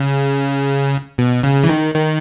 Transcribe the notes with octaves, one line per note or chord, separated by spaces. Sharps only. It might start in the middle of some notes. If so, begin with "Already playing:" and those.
Already playing: C#3
B2
C#3
E3
D#3
D#3